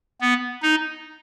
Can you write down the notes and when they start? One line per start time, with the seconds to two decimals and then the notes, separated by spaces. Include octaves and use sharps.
0.21 B3
0.62 D#4